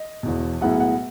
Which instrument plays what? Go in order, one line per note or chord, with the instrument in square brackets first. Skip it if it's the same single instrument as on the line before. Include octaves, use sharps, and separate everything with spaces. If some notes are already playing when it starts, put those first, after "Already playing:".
Already playing: [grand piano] D#5
E1 E2 B2
B1 A2 G#3 B3 E4 F#5
F#5